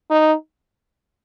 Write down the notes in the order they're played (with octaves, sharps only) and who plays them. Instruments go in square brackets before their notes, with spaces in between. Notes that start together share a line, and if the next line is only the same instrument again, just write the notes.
[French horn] D#4